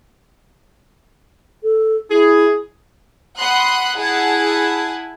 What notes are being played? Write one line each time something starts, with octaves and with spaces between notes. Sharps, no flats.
A4
E4 G#4
F#5 B5 C6 D#6 F#6
E4 G#4 F#5 G#5 A5